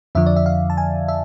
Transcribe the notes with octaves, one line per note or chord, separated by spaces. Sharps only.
F2 D3 F3 E5
D5
E5
F5
A5
G#5
E5